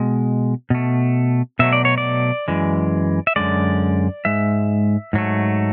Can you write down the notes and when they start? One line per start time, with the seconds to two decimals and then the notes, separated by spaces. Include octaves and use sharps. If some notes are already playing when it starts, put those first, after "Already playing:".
Already playing: B2 G#3
0.70 B2 A3
1.59 B2 F#3 A3 E5
1.73 D5
1.85 C#5
1.98 D5
2.48 F#2 E3 G#3
3.27 E5
3.36 F#2 D3 G#3 D5
4.25 G#2 G#3 E5
5.13 G#2 F#3 A3